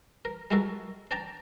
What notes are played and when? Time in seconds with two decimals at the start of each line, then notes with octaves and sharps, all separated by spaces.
0.25 A#4
0.51 G3 G#3 E4 F#4 A4 A#4
1.11 D4 D5 G5 A5 A#5